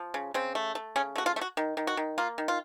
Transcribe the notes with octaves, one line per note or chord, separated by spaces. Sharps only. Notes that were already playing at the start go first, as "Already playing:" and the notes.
Already playing: F3
C#3
C#3 C4
A3
A3
C#3 C#4
A3 F#4
F4
A3
F#4
D#3
D#3
F#4
D#3
A#3 F4
D#3
F4